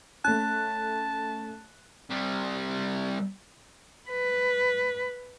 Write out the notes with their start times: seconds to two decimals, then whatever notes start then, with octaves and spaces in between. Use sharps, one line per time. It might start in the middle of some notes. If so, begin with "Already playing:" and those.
0.25 A3 C#4 A5 F#6
2.10 C3 G3
4.09 B4